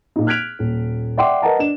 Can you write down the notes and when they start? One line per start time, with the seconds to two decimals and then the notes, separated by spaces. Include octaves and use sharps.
0.16 A#2 D#4
0.27 F6 F#6 G#6 B6 D7 F7
0.59 D#1
1.18 D5 E5 F#5 G5 C6 D6
1.42 A#4 B4 D#5 F#5 A5 A#5
1.59 D4 E7